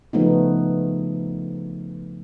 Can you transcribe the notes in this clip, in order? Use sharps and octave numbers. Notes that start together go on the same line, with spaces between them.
C#3 F3 A3 B3 D#4